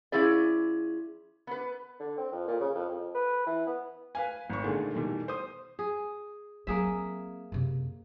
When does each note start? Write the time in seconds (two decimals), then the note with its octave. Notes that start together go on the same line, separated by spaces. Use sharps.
0.12 F3 C#4 E4 G#4 D5
1.47 B3 B4
2.00 D3
2.17 C4
2.32 F2
2.47 A#2
2.60 C#3
2.75 F2
2.89 F2
3.14 B4
3.46 E3
3.67 B3
4.15 B4 F5 G#5
4.50 G#1 C#6
4.63 A#2 D3 D#3 G#3 A3
4.94 B2 D#3 E3 G3 A3
5.28 C5 D#6
5.79 G#4
6.67 F#3 A#3 C4 G#4 E5
7.52 F#2 C3